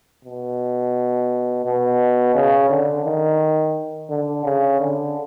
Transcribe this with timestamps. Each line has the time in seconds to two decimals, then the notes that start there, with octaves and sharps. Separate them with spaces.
0.25 B2
1.65 B2
2.35 C#3
2.70 D3
3.05 D#3
4.09 D3
4.45 C#3
4.80 D3